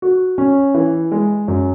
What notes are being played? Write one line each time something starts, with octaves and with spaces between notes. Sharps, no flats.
F#4
C#4
E3
G#3
F#2